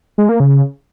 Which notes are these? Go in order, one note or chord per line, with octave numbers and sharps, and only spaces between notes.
G#3
A#3
C#3